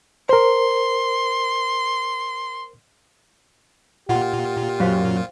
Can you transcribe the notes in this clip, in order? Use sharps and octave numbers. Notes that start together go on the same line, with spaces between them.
A#4 C5 C6
A#2 F4 G4 F#5 C6
F#2 C5 F5 G5